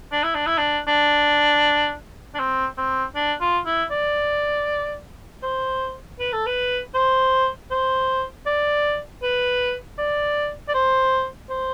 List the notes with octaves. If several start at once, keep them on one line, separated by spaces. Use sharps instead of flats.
D4
E4
D4
E4
D4
D4
D4
C4
C4
D4
F4
E4
D5
C5
B4
A4
B4
C5
C5
D5
B4
D5
D5
C5
C5